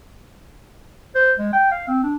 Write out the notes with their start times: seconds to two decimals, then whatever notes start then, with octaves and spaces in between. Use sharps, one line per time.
1.15 C5
1.38 G#3
1.53 G5
1.71 F5
1.88 C4
2.03 D4